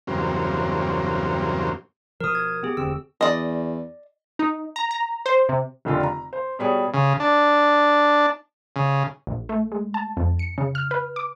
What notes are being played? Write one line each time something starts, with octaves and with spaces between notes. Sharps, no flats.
E2 G2 C#3 F#3 A#3 C4
B2 F3 A#4 D#6
G#6
B3 G4 G#4
E1 D2 D3 C4 E6
E2 D5 D#5
D#4
A#5
A#5
C5
C3
F1 D3 F4 G4
A#5
C5
B2 G3 G#4 C#5
C#3
D4
C#3
A#1
A3
G#3
A5
F2
C#7
C#3
F6
B4
D6